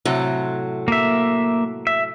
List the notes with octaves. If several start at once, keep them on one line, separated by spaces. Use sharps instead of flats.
A2 C3 F#3
A#3 E5
E5